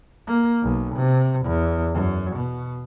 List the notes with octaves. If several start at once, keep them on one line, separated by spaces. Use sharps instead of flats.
A#3
B1
C3
E2
F#2
B2